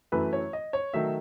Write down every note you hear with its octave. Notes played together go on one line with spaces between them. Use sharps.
F#2 E3 A3 B4
C#5
D#5
C#5
D#3 F#3 A3 E5